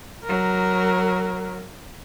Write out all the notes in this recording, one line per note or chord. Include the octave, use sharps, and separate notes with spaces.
F#3 A#4